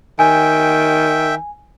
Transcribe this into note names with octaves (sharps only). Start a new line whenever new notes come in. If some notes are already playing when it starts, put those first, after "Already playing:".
D#3 E5 G5 G#5